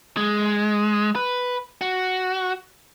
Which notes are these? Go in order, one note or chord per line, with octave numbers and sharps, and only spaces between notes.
G#3
B4
F#4